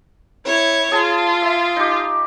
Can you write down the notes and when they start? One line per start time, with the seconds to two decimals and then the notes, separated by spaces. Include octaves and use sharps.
0.45 E4 C#5
0.92 F4 G#4 A5
1.42 E5
1.76 D#4 G4